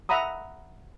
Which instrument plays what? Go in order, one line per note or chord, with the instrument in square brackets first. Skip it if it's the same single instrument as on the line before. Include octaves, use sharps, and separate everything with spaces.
[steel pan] E5 F#5 A#5 B5 D#6